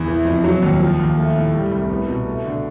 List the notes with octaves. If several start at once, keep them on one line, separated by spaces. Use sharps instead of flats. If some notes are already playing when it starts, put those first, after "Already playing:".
Already playing: E2
E3
F2
F#3
D#2
F3
D#2
A3
A2
G3
C2
B3
B2
A3
D3